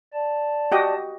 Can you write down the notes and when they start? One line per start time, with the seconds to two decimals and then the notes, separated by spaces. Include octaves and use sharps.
0.13 D5 A5
0.72 F#4 G4 D#5